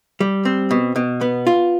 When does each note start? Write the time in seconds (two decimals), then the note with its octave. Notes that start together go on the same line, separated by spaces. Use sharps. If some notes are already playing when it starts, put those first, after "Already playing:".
0.20 G3
0.45 C4
0.71 B2
0.96 B2
1.21 B3
1.47 F4